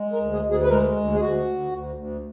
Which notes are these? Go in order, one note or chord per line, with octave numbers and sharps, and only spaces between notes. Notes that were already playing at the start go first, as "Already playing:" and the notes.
Already playing: G#3
A#4
D2
G#4
D2
G#4
B4
G#3 A#4
D2
G#4
D2 F#4
D2
D2
D2